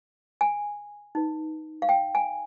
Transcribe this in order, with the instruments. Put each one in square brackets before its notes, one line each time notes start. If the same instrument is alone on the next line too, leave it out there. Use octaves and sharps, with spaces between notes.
[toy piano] G#5
D#4 B4
F5
G5
G#5